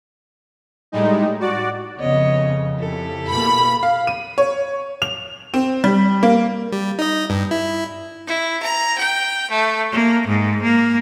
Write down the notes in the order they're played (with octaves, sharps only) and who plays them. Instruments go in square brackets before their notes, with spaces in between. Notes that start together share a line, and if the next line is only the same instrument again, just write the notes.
[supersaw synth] A2 G3 G#3 D#4
F#4 D5
[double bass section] F2 C#3 [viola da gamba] B3 C#5 D#5
[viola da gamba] E4 G4 A4
[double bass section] B2 A#3 [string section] B5
[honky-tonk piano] F5
D#7
C#5
F7
C4
G3
A#3
[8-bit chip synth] G3
D#4 D#5
G2
E4
[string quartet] E4
A#5
G5
A3
A#3
G#2
A#3